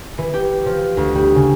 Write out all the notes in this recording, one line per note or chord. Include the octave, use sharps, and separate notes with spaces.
E3
G4
F3
D2
G3
C#3